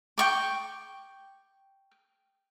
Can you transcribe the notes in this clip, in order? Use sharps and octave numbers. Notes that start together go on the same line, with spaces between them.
G5 C#6 D6